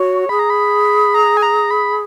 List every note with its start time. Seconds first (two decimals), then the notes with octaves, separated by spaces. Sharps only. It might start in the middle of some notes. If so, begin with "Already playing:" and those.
Already playing: F#4 C#5
0.29 G#4 B5
0.39 A#5
0.50 B5
1.14 A#5
1.37 G#5
1.42 A#5
1.71 B5